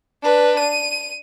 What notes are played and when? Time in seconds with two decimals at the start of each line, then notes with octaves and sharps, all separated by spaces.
0.23 D4 B4
0.60 D#7